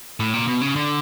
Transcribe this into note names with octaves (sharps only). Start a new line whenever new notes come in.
A2
A#2
B2
C#3
D3